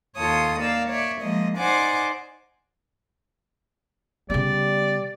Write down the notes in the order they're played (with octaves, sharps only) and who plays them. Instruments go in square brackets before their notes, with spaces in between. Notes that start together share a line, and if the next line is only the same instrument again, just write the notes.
[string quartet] D#2 F4 A4 C#5 D#6
A#3 D5 F5 E6
C#5 D5 E5
F3 G#3 A#3 D#5
D#4 C5 D5 F#5 G#5 D6
[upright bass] C#3 B3 [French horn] G3 [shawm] D5